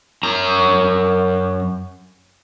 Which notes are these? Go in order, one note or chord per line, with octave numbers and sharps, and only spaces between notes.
F#2 A#5